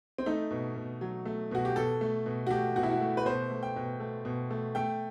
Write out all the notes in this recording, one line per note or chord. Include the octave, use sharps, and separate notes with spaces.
C4
A3 D#4
B2
B2
F#3
A3
B2 F#4
G4
B2 A4
A3
B2
F#4
A3 G4
B2 F#4
E4
F#4
A3
B4
B2 C5
A3
G5
B2
A3
B2
A3
A3 G5